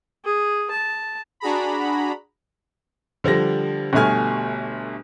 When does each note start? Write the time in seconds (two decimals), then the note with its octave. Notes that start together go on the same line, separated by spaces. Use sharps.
0.25 G#4
0.71 A5
1.40 D4 F#4 G#4 A#5 B5
3.24 D3 F3 G3 A#6
3.93 G1 B2 G3 A3 G#5 F6